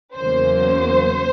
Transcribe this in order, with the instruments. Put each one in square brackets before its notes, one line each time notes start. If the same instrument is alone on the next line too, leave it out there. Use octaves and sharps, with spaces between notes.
[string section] E2 C#3 F#3 A#3 C5